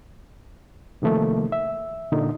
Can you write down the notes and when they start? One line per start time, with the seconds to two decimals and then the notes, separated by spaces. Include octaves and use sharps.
1.02 C3 D#3 F3 A3 A#3
1.52 E5
2.12 A#2 D3 D#4